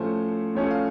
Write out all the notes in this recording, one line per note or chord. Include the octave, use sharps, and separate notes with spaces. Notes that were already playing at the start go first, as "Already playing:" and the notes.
Already playing: A2 F3 A3 C#4 C5
A2 F3 A3 C#4 C#5
F5